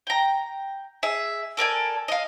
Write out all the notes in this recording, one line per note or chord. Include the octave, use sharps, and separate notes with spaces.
G5 A#5
G#4 E5
A4 A#4 D5 G#5
D#5 F5